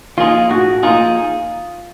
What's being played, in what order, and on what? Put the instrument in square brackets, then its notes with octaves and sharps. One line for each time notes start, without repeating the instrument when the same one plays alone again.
[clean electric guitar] F3 A#3 D#4 G#4 [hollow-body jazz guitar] F4
[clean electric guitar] A2 [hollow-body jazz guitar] F#4
[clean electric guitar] F3 A#3 D#4 G#4 [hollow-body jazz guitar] F4